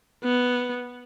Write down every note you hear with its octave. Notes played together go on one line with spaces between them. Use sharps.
B3